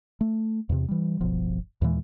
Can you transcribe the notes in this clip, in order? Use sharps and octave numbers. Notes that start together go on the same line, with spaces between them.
A3
E2 C3
E3 G3
D1 G1 B2 F3
D#2 A#2 E3 G#3